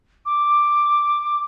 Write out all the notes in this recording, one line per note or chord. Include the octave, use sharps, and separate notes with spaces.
D6